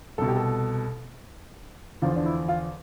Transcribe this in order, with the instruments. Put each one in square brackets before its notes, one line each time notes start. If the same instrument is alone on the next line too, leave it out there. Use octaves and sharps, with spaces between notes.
[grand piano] C2 B2 A4
G4
A4
E2 D3 F3 F4
D4
E4
F4